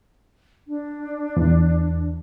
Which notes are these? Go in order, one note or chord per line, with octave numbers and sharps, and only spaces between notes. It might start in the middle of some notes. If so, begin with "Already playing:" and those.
D4
E2